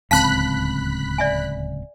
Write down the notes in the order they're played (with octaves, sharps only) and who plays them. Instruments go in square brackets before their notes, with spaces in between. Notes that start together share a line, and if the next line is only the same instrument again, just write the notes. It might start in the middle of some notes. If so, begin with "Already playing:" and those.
[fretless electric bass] D1 C#2 C4 [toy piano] F5 A5 [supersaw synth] B5 F#6 B6
[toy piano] D5 E5 G#5